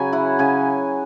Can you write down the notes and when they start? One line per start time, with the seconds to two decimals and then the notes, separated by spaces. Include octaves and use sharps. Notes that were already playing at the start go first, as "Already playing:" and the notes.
Already playing: C#3 F#3 G#5 B5
0.13 E4 F#5
0.39 C#3 G#5